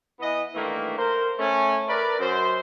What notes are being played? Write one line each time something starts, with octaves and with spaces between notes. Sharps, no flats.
E3 B3 D#5
G2 D#3 E3 A3 A#3
A#4 C5
A3 C#4
A#4 B4 D5
F#2 C5